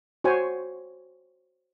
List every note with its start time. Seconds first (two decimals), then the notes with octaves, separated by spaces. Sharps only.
0.24 F#4 C5 C#5 G#5